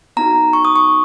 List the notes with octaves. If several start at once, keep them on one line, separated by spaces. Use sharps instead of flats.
B3 D#4 F#4 A#5
C#6
D#6
C#6